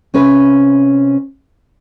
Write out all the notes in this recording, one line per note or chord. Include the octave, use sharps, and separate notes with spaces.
C3 C#4 B4 E5